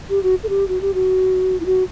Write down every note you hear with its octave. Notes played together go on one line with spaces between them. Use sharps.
G4
F#4
A4
G4
F#4
G4
F#4
E4
F#4